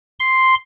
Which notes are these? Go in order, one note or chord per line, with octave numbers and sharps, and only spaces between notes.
C6